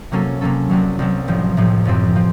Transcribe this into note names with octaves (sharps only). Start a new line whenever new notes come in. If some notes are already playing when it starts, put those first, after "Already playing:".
C3 F#3 A#3 C#4 A4
C3 F#3 A#3 C#4 A4
C2 C3 F#3
C2 C3 F#3
A1 A2 F3
A1 A2 F3
F#1 F#2 F3 C4
F3 C4